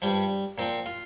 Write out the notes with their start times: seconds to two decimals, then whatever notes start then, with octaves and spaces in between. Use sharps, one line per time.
0.02 G2 F3 G3
0.58 A#2 F3 C4
0.86 F4